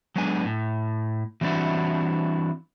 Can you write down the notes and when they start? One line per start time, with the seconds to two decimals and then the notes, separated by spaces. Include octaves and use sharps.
0.16 F#3 G#3 B3 D4 G#5
0.45 A2
1.41 E3 G3 C4 D4 E4 F#4